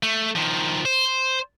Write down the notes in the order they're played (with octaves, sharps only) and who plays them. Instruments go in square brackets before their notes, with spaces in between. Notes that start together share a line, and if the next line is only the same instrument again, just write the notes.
[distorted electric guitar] A3
D#3 F3
C5